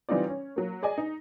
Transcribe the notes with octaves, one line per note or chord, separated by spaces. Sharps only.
E3 G3 C4 D#4 F4 D5
C#4
F#3 A#3
G#4 D5 D#5 G#5
D#4